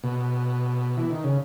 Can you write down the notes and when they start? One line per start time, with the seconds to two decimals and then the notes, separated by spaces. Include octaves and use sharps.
0.04 B2
0.97 E3
1.11 D#3
1.24 C#3